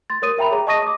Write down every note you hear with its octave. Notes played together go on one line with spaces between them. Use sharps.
C6 A6
A#4 C#5 D#6 D#7
A#4 E5 G5 A#5 B5 F7
G#4 C#5 A#5
D#5 A5 C#6 D#6 A#6 D#7
D6 D#6